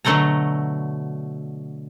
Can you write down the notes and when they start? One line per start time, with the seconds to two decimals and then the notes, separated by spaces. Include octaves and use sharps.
0.05 B2 D3 F#3 A3 F#5 A#5